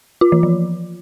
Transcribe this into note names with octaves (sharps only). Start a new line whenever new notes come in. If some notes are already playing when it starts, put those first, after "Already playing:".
F4
E3
F3